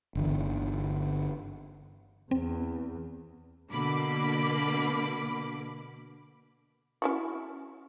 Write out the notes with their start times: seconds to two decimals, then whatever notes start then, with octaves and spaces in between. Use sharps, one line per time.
0.15 G1 D3 E3
2.31 E2 C4
3.70 B2 D3 A#3 B5 D6
7.02 C#4 E4 F#4